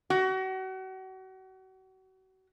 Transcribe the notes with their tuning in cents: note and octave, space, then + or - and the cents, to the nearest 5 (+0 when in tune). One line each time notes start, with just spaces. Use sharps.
F#4 +35